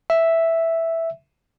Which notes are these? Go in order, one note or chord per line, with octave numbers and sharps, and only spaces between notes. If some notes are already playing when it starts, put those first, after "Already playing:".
E5